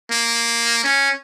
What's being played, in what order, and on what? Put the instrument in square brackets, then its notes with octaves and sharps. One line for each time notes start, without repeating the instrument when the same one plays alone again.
[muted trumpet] A#3
C#4